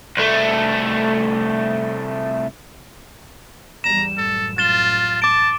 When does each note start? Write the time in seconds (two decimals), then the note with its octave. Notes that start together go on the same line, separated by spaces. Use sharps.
0.17 C2 A3
3.84 E2 G#2 G3 A#5 E7
4.17 A1 F#2 A4
4.58 F4 A6 E7 G7
5.22 A5 D6 D7